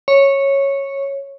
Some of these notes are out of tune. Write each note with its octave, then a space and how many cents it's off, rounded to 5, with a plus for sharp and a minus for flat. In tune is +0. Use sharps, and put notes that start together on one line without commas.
C#5 -10